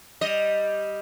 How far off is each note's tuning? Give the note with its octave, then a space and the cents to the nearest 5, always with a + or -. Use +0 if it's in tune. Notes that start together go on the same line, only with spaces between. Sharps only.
G3 +0 D#5 +0